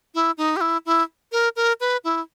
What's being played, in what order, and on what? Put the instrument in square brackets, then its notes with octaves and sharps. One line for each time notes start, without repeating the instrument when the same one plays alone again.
[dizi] E4
D#4
G4
E4
E4
A#4
A#4
B4
E4